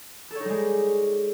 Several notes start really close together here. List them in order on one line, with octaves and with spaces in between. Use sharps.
A4 C#5 D#4 G3 G#3